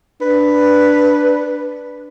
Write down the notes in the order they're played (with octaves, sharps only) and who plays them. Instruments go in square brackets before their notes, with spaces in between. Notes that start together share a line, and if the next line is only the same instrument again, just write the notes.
[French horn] D4 [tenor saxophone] B4